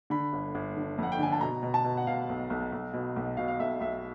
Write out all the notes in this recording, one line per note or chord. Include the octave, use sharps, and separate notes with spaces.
D3 B5
G1
G1
D3
F2 F#5
G5
D3 G#5
A5
B2 A#5
B2
A5
B2
F#5
B2 F5
B1
B1
B1
B2
B1
B2 F5
F5
B1 E5
B1 E5